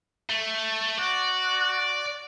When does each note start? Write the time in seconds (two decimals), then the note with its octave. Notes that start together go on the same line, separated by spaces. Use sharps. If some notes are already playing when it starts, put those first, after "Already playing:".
0.29 A3
0.99 F#4 D5